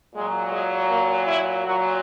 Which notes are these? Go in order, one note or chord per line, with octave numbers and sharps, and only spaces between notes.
A#2 F#3 G#3
G#3
A#3
E4
A#2 F#3 F#4